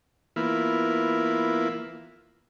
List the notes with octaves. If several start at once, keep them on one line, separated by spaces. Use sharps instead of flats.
E3 A#3 B3 E4 F4